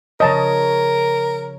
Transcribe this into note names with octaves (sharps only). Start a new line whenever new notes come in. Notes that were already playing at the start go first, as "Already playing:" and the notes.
C#3 F3 A#4 C#5 D#5 A5 A#5